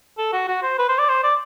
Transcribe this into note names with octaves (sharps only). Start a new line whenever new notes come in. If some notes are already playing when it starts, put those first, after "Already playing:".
A4
F#4
F#4
C5
B4
C5
D5
C5
D5